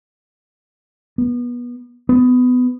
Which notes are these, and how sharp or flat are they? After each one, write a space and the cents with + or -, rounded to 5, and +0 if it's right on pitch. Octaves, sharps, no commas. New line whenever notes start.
B3 -25
B3 +20